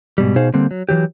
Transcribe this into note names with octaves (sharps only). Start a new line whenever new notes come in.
G#2 B2 G3
B2 D#4 G#4 C5 F5
D3 G3 A#3 C4
F#3
E3 F#3 G4